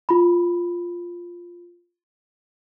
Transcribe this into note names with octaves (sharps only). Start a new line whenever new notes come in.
F4 B5